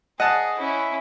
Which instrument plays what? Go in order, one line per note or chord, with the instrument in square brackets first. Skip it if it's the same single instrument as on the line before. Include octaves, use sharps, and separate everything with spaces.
[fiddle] G#4 [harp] D#5 [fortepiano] F#5 A5
[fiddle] C#4 E4